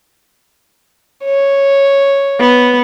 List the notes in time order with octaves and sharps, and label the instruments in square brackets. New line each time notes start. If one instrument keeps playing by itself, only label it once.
[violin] C#5
[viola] B3